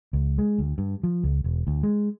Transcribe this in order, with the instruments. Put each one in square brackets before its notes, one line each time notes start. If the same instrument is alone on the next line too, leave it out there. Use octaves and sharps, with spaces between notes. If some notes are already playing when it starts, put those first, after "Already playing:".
[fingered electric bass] C#2
G#3
D2
G2
F3
C#2
E1
D2
G#3